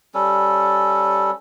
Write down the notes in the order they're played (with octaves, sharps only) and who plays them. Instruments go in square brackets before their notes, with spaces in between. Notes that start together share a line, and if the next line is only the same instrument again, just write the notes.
[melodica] G3 C#4 A4